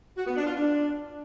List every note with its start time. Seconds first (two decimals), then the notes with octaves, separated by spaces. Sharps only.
0.16 F#4
0.26 B3
0.36 D4
0.46 F4
0.56 D4